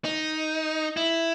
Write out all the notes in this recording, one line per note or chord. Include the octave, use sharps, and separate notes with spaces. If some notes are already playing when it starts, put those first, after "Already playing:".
D#4
E4